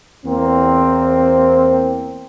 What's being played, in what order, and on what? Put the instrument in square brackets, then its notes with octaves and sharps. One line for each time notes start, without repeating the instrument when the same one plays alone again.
[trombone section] E2 A#3 C4